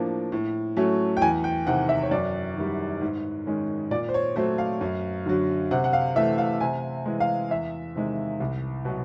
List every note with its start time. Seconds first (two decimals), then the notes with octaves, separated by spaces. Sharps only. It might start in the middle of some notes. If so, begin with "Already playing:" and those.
Already playing: A2 F3 A#3 D4
0.32 A2
0.77 F#3 A3 C#4
1.17 G5
1.21 E2 G#5
1.44 G5
1.66 C3 D#3 F#5
1.89 E5
2.03 C#5
2.11 F#2 D5
2.57 D#3 G3
3.01 G#2
3.47 D#3 G#3 C#4
3.91 A#2 D5
4.09 C5
4.14 C#5
4.36 F#3 A3 C4 C5
4.58 F5
4.81 F#2
5.26 D3 F#3
5.71 C3 F#5
5.84 F#5
5.93 F5
6.16 E3 A3 E5
6.38 F5
6.61 C3 G#5
7.06 E3 G#3
7.20 F5
7.50 E2 E5
7.96 C3 D#3 G#3
8.40 C2
8.85 B2 F#3